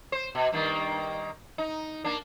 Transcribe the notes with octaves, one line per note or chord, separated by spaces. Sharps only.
C5
B2
G2 D#3 A#3
D#4
A#3 D4